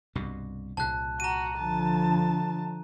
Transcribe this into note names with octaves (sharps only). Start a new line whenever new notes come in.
C2 G2 B2
C2 A#2 C#3 A5 F#6
F#4 A#5 D#7
D3 F3 A5